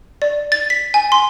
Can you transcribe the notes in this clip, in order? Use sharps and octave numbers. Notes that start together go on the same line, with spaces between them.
D5
A6
B6
G#5
C6